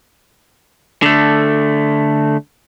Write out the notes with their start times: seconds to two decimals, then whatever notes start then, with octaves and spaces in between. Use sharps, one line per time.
1.02 D3 A3